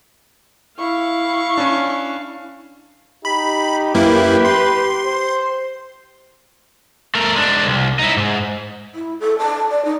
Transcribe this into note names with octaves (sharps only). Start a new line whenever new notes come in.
E4 F5 C#6
C#4 D4
D#4 G4 B5
F#2 A#3 E4 B4
C6
C5
A3 A#4
G#3 D4
C2
D#4 E4
G#2
E4
A4
A5
D5
D#4